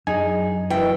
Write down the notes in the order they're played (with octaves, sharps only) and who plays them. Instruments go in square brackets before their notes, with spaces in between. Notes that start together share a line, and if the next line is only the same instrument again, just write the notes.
[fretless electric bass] F#2 [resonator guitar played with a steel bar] D#4 G#4 [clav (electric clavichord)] G#5
[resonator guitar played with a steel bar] B2 D#3 E5 [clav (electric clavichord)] E3 [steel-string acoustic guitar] G5